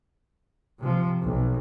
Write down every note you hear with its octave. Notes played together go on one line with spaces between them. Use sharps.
C3 F3
B1